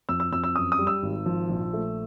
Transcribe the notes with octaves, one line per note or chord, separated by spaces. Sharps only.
F2 E6
E6
F2 E6
E6
F#2 D#6
D#6
G3
E6
G#1
F3
A#1
A3